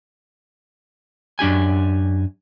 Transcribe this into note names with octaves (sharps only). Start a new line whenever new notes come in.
F#2 D4 G4 G#5